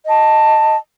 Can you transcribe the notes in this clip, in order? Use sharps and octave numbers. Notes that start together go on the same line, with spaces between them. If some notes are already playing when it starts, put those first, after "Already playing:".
D#5 A5